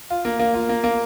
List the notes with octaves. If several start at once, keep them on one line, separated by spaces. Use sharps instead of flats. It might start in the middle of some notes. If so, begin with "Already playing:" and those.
F4
A#3
A#3
F4
A#3
A#3